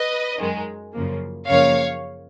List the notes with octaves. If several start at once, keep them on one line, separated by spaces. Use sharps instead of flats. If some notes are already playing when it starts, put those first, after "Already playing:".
Already playing: B4 D#5
F#2 D#3 G#3
F#2 C#3 F3 A#3
F#2 C#3 F3 A#3 C#5 F5